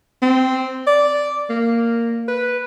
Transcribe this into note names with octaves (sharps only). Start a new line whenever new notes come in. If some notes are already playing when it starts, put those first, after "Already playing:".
C4
D5
A#3
B4